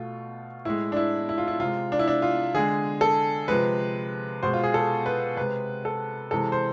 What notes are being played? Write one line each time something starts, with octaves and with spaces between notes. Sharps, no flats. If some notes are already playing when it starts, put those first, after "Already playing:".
Already playing: B2 A3 F4
A2 G#3 E4
D4
E4
E4
F4
E4
C3 G#3 F4
D4
E4
D4
F4
D3 G#3 G#4
A4
C3 F3 G#3 B4
B2 G#3 C5
F4
G#4
A4
B4
C3 G#3 B4
A4
C3 E3 G#3 A4
C5